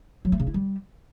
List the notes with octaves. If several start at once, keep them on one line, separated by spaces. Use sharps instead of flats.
F#3
A3
C#3
E4
G3